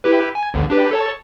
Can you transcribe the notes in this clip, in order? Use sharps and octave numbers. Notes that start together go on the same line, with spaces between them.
E4 G4 B4
G#5
A1 D#2 D3
D4 G4 B4
A4 C#5 A5